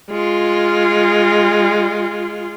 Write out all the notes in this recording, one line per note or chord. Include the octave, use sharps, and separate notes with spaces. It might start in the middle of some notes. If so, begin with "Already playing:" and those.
G#3 F4